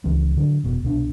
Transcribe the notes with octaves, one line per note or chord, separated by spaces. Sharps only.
C#2 E3 F3 C4
D3 F#3
F1 B2
C2 B2 D4